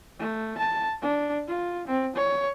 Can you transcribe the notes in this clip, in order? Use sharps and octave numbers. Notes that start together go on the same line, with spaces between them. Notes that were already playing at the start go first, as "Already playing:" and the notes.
A3
A5
D4
F4
C4
C#5